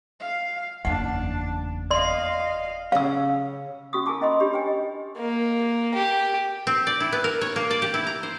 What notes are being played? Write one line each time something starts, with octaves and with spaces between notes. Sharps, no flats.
F5
F#1 E2 D4 F#5
D5 D#5 F5 C6
C#3 C#4 F5 E6
C#4 F#4 C#6 D#6
E4 A#4 G#5 A5 D6
C#4 E4 D#5 A5 B5 C6
D4 G4 C#5 B5
B4 G5 G#5
D#5
A#3
G4
C4
D5
E4
B3
A#4
C#5
A#3
D5
G4
E4
A#5
C5